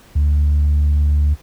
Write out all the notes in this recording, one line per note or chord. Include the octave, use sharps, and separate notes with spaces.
D2